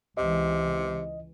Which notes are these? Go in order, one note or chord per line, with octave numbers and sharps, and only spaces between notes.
C#2 C3 E3 D#5